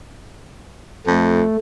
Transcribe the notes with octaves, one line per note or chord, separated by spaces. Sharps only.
F2 A3